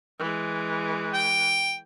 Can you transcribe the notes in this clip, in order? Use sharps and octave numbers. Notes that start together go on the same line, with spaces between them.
E3 G#3
G5